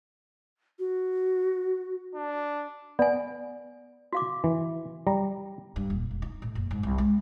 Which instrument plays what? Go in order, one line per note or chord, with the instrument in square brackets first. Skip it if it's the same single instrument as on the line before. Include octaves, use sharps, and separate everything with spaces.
[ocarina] F#4
[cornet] D4
[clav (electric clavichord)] B3 [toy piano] D5 G#5
[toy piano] F#4 F5 D6
[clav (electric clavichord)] E3
G3 A#5
[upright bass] G2
D#1
E1
D#4
A2
F#1
G#2
C2
G#3